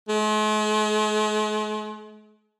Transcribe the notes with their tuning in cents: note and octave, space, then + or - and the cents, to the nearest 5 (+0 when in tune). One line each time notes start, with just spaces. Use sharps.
G#3 +45